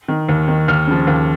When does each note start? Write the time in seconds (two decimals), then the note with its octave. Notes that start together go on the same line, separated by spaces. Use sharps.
0.08 D#3
0.28 D#2
0.48 D#3
0.68 D#2 F6
0.87 C#3 F3
1.07 D#2